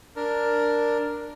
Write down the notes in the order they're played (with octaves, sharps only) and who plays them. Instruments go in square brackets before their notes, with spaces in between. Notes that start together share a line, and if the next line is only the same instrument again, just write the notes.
[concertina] D4 A#4